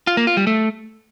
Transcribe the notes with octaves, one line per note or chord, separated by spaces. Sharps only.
F4
A#3
F4
G3
A3